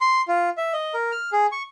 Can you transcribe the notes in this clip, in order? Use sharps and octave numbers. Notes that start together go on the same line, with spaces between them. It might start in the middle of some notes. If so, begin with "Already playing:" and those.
C6
F4
E5
D#5
A#4
F6
G#4
C#6